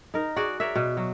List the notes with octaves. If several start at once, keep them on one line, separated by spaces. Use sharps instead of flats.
D#4 A#4
F#4 G#4 D5
A#4 C#5 D5 E5
B2
F#3